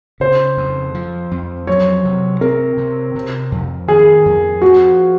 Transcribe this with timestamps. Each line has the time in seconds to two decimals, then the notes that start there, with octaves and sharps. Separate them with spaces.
0.20 C#3 C5
0.57 F2
0.95 F3
1.31 F2
1.67 F#3 C#5
2.05 C3
2.41 C4 A#4
2.77 C3
3.15 C3
3.52 F2
3.88 D#3 G#4
4.26 F2
4.62 F3 F#4